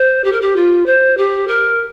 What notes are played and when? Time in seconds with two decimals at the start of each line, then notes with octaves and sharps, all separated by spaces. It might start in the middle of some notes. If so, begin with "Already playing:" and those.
Already playing: C5
0.24 G4
0.32 A#4
0.41 G4
0.56 F4
0.86 C5
1.17 G4
1.47 A#4